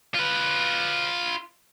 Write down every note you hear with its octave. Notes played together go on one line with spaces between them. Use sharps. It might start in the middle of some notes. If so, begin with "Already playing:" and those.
F4 B4